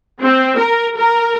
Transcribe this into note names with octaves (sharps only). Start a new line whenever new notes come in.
C4
A#4
A#4